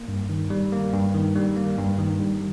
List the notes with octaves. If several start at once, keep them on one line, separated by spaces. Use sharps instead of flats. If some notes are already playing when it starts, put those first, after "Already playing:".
Already playing: A#3
G2
D#3
G3
A#3
G2
D#3
G3
A#3
G2
D#3
G3